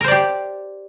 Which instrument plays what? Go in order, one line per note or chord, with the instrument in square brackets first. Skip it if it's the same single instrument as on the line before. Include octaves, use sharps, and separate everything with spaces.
[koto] A#4
C5
D5
G4